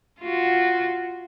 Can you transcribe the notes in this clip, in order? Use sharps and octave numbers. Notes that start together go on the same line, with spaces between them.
F4 F#4